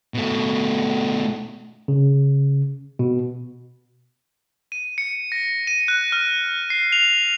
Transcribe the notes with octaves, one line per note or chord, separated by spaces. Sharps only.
B2 A3
C#3
B2
D#7
C#7
A#6
D#7
F#6
F6
C7
F7